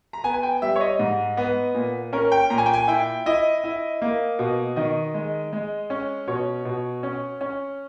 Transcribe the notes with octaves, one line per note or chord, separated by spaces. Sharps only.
A#5
B3 G#5
G#5
G5
G3 E5
C#5
D#5
G#2
B3
A#2
C#4 A#4
G5
A#2 A#5
G#5
G5
G#5
E4 G5
E4 D#5
E4
A#3
B2
D#3 D#5
G#3
G#3
C#4
B2 C#5
B2
C#4
C#4